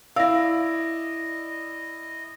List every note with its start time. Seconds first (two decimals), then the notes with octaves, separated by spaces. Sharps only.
0.16 E4 D5 D#5 F5 E6 A#6